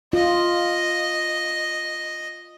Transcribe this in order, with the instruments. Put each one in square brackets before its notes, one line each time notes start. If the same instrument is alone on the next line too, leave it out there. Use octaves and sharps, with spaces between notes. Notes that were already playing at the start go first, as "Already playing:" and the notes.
[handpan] F4 [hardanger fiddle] D#5